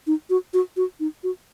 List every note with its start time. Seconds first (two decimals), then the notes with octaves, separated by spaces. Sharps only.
0.07 D#4
0.30 F#4
0.54 F#4
0.77 F#4
1.00 D#4
1.23 F#4